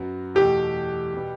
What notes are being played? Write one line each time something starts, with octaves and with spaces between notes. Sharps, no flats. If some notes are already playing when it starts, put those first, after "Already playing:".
Already playing: F#2 F#3 B3 F#4
E2 B2 A3 G4
B2 G3 B3